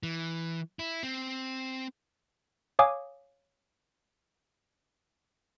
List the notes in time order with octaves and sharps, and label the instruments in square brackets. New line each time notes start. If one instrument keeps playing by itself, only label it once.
[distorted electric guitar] E3
E4
C4
[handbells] C#5 F5 G#5 D6 D#6